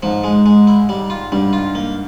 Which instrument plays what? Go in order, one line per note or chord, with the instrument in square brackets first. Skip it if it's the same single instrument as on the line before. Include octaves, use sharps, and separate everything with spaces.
[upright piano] G#2 [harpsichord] F3
[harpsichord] G#3
G#3
E4
G3
F4
[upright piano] G2 [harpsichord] G3
[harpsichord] F4
A#3